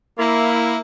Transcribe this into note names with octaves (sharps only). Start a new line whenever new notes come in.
A#3 E4